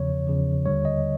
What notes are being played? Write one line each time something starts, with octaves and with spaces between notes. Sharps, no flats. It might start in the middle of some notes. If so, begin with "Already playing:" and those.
Already playing: E2 C#3 F3 C#5
E2 C#3 F3
D#2 D3 G3 C#5
D#5